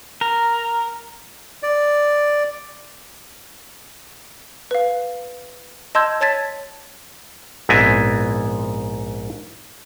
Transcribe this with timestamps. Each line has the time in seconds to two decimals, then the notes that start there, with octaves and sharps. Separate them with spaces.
0.21 A#4
1.63 D5
4.71 B4 F5
5.95 D#5 A5 C6 E6 G6 G#6
6.21 C#5 A5 G#6 A6 B6
7.69 A#1 G#2 B3 C4 E4 G#5